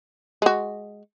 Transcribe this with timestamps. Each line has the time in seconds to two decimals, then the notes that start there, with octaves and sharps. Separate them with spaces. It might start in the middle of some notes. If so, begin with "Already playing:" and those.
0.42 G#3 F#4